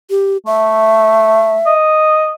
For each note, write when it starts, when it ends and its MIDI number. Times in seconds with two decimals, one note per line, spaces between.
0.10 0.37 67
0.46 1.60 57
0.46 1.73 76
1.66 2.35 75